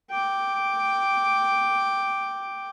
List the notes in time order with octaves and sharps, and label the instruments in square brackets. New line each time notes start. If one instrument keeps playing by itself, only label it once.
[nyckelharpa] G5 D6